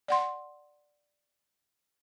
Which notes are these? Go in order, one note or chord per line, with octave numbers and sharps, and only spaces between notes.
D5 F#5 C6